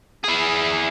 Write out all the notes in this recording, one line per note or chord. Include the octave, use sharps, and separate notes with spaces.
E4 G#4